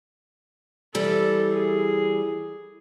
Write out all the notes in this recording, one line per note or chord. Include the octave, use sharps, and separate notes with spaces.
E3 G3 C4 A4
G#4